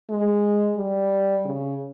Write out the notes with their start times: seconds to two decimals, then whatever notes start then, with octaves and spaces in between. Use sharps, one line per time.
0.10 G#3
0.77 G3
1.45 C#3